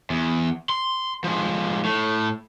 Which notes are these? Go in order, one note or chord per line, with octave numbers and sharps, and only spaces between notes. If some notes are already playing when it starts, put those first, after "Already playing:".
E2
C6
F3 G#3
A2